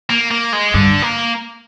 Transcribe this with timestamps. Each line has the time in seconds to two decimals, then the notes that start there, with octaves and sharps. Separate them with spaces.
0.10 A#3
0.31 A#3
0.53 G#3
0.74 G2 D3
1.02 A#3